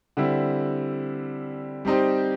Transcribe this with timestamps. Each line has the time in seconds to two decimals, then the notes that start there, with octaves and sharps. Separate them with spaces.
0.17 D3 G3 C4 E4
1.85 G3 C4 D#4 G4 C5